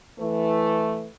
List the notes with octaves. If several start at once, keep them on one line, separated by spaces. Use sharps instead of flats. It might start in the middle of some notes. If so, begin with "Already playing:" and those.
E3 A3 B4